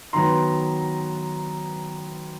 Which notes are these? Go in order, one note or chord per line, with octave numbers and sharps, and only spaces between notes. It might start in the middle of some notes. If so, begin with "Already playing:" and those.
D#3 F#3 B3 A#5 C6